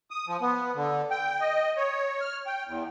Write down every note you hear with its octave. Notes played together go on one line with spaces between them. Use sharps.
D#6
F3
B3
D3
G5
D#5
C#5
F6
G5
E2